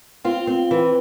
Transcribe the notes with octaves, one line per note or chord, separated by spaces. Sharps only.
C4 F4
C4
E3